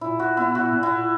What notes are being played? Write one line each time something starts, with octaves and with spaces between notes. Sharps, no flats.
A#2 E4
A#2 F#4
B3 E4
A#2 F#4
A#2
E4
A#2